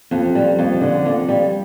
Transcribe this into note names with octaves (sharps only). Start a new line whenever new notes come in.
F2
G3
F2
D3
F2
G3